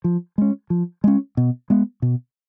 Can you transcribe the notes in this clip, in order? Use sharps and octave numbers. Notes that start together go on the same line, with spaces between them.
F3
G#3 C#4
F3
G#3 C#4
B2
G#3 B3
B2